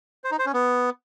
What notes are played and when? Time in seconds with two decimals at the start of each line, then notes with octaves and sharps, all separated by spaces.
0.24 C5
0.31 D#4
0.39 C5
0.46 C#4
0.53 B3